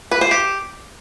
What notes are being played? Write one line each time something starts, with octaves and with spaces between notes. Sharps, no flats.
B4
C5
G4